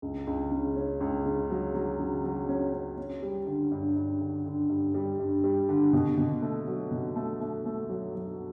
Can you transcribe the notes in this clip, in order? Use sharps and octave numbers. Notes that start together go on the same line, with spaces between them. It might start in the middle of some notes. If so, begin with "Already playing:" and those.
C#2
C#2
C#3
C#4
C#2
C#3
F#3
F#3
C#3
F#3
C#4
C#4
C#4
G3
D3
G2
G2
D3
D3
G2
G3
G2
G3
D3
B2
B2
A3
F#3
B2
A3
A3
A3
F#3
F#3